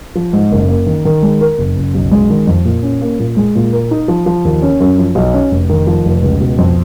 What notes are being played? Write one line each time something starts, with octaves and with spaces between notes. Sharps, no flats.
F3
G#2
F#1
A#3
D#3
D#3
G#3
A#4
F#1
F#1
B1
G#3
D#3
F2
A#2
C#4
A#3
A#2
G#3
A#2
A#4
D#4
F3
F3
D#2
C#4
F#2
F3
B1
C#4
F1
D#3
F3
F1
C#2
B2
F2